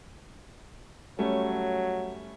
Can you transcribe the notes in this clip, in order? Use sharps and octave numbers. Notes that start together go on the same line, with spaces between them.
F#3 G3 A3 C#4